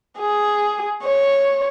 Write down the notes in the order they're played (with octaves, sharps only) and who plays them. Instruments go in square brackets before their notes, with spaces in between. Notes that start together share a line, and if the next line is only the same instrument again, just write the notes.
[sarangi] G#4
C#5